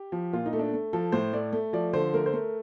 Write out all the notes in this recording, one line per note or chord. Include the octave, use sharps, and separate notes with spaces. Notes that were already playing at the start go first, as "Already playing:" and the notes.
Already playing: G4
F3
A#2 F4
D#4
A3
D4
A3
F3 A4
A2 C5
A3 D5
A3
F3 D5
D3 C5
A3 A#4
C5
A3 A#4